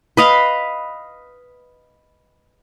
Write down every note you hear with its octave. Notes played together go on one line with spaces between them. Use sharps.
B4 D#5 F5